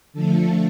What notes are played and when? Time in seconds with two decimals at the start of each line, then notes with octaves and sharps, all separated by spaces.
0.13 D3 F3 A3 A4